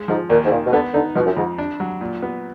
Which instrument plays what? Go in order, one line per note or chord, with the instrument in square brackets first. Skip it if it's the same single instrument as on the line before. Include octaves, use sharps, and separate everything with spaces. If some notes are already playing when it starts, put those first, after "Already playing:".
Already playing: [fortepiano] G#3
[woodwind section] G#2 [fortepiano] F3
[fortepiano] D#2 [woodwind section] A#2
[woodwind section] G#2
[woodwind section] A#2 [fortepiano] D#3
[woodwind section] B2
[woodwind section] D3 [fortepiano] B3
[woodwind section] D3 [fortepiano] D#4
[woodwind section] B2 [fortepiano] F3
[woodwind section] F#2
[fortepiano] F2 [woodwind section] G#2
[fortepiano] D4
F#3
A#2
B3